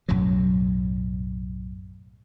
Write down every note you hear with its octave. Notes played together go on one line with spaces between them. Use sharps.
B1 F#2 A2 F#3